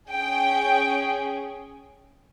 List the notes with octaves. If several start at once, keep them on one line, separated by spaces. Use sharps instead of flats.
C#4 G#4 G5